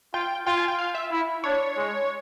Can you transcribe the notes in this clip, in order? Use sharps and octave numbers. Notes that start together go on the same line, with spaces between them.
F4 G5
F4 G5
G#5
G5
F5
E5
E4
D4 C#5
G#3